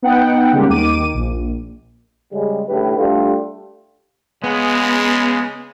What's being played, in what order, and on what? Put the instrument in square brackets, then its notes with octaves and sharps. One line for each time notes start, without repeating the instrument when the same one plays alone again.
[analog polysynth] B3 D#4 F#5 G5
C#3 G3 G#3 A#3 G4
D#2 D#3 D6 D#7
A#1
[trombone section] C#3 G3 G#3
A1 A2 D3 E4 G4 B4
G3 A3 D4 F4 G4
[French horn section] C#3 [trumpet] G#3 [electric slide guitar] B3